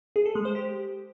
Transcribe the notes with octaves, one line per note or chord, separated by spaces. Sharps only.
G#4
A4
G#3
C5
G4